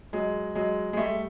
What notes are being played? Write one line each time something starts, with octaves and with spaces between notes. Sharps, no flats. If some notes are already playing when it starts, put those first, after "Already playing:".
F#3 G#3
F#3 G#3
G#3
G3 A3